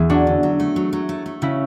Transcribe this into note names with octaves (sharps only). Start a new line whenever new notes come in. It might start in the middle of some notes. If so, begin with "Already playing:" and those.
Already playing: E2 E4 G#4
F#3 D4 F#4
D3
F#3
A3
F#3
F#3
A3
A3
C#3 C#4 E4